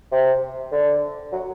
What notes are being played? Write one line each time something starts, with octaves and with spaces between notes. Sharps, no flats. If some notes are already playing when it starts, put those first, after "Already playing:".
C3
D3
F#3